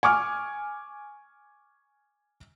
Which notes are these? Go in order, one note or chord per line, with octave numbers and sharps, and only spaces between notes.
G#5 C#6 D6 F6